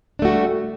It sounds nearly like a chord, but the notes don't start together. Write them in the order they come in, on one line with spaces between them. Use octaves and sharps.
D4 A3 F#4 G3